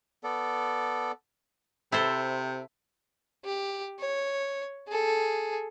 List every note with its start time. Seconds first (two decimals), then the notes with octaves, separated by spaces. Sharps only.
0.24 B3 A4 D5
1.92 C3 E4 A4 C5
3.45 G4
3.99 C#5
4.88 G#4 A4